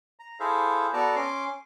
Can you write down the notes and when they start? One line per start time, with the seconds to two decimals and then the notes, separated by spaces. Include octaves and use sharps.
0.20 A#5
0.40 E4 G#4 A4 C5 E5 F5
0.93 B3 F#4 A4 D5 A5 A#5
1.16 C#4 C6 D6